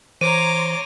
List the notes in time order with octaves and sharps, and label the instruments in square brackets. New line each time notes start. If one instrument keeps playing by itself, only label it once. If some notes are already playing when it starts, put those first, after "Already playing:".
[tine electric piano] E3 C5 [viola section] C#5 A#5 C6 [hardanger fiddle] D6 [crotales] D#7